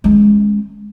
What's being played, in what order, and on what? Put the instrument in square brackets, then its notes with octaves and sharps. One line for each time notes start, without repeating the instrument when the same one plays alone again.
[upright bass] G#3 C#4